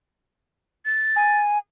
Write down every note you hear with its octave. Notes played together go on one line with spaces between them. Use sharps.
A6
G#5